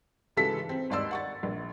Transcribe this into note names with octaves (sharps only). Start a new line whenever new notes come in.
G#2 C#3 E3 F#4 A4 B6
C4
G#1 D#2 D5 D#5 C6 E6
F#5 C#6 A6
A#1